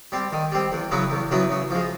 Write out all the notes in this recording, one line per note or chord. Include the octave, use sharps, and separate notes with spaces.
G3 C4
D#3
G3 C4
E2
C#3 F#3 B3 E4
E2
C#3 F#3 B3 E4
C#3
F3 G#3